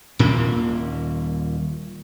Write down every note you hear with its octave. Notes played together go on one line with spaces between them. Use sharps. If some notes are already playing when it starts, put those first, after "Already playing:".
D#1 A#2 A#3